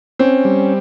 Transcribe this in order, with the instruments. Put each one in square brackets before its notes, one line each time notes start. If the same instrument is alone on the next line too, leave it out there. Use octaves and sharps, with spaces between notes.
[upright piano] C4 [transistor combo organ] C#4
[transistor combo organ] G3